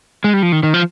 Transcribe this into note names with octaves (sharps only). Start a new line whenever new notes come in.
G#3
G3
F3
D#3
D#3
F3